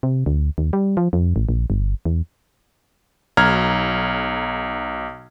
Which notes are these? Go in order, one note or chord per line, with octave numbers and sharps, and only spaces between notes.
C3
D2
D#2
G3
F3
F2
A1
A#1
G1
E2
B1 A#5 F6 G#6